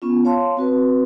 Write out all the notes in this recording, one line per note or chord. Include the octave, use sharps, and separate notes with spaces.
B3 C#4 F4
C#5 F5 A5 C6
C4 F#4 B4